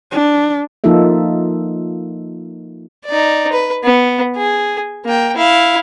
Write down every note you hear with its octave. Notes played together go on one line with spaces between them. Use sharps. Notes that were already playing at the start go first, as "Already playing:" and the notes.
D4
F3 A#3 D#4 F4 A4 E5
D#4 D5
B4
B3
G#4
A#3 G5
E4 F5